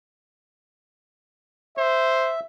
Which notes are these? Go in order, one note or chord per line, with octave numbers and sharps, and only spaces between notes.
C5 E5